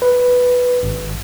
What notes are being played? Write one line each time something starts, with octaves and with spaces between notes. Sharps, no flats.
B4
G#1